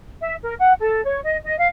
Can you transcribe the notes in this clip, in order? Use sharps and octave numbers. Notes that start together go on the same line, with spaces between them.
E5
A#4
F#5
A4
C#5
D#5
D#5
F5